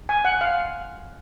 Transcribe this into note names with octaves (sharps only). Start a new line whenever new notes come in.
G#5
F#5
F5